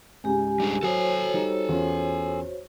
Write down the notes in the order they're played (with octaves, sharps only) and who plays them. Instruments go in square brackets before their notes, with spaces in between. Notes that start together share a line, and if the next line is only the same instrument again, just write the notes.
[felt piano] C#2 G#2 [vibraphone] G4 G#5
[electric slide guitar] G3 D4 G#4
[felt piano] F#3 [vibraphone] F#4 C5 C#5 [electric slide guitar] A4 G#5
[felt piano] G3 D#4
E2 C#4 F4